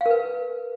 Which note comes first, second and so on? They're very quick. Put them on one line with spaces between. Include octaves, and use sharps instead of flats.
F5 A#4 B4